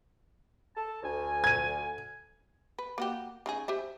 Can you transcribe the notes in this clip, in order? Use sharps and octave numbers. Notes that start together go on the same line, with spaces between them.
A4 A5
D2 G#5
G#6 D#7
B4
A#3 F#4 G4
C#3 D#4 G#4
G4 C5 E5